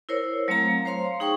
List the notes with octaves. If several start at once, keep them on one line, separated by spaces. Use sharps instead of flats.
E4 A#4 C5 C#5
F#3 A3 C4 F5 A#5
C5 C#5 F5 C6
D#4 G#4 G5 C#6